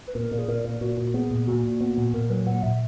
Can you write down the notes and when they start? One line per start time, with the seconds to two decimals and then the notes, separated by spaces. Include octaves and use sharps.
0.08 B4
0.14 A#2 A#4
0.31 A#2
0.39 G#4
0.48 A#2 A#4
0.64 A#2
0.81 A#2 F#4
0.97 A#2
1.14 B3 G#4
1.30 A#2
1.47 A#2 F#4
1.63 A#2
1.81 B3
1.97 A#2
2.13 A#2 A#4
2.30 F#3 B4
2.46 A#2 F#5
2.63 A#2 E5